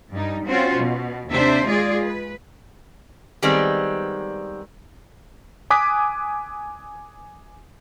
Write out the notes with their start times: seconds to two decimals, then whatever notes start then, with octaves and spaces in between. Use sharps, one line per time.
0.13 G2 G3 D#4
0.47 C4 C#4 F4 F#4 C5
0.77 B2
1.29 D#2 C3 D4 C5 E5
1.66 G#3 F4 G#4 D5
2.06 B4
3.42 D#3 G3 G#3 B3 C4
5.70 G#5 D6 D#6 F#6 B6